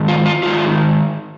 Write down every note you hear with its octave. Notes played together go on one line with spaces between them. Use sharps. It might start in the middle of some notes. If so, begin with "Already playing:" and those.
Already playing: G#2 D#3
F4
F4
G#2 D#3 F4